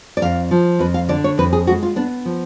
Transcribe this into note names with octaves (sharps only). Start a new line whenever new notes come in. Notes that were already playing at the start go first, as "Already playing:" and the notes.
D5
F2 F5
F3
F2 B4
F5
D3 D5
C#5
F2 B4
G#4
G#3 F#4
F4
B3 D4
F3